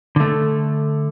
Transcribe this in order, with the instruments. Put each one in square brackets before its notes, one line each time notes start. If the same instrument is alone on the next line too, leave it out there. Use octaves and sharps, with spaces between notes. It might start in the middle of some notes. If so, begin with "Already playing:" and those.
[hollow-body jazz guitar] D3 A3